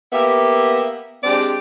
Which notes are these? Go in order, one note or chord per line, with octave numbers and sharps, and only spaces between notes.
A#3 B3 G4 E5
G#3 C4 D4 G4 D5